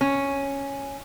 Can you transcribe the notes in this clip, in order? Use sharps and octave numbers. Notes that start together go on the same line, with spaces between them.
C#4